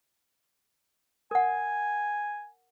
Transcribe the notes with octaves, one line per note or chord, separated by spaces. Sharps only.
A#4 F#5 G#5